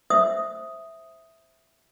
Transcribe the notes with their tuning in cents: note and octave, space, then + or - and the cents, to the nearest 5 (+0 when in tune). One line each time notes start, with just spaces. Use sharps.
C5 +5 E5 +0 D#6 +0